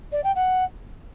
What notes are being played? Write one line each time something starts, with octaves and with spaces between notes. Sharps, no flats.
D5
G5
F#5